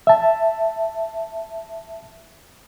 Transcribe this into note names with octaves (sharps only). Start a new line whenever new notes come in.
E5 A5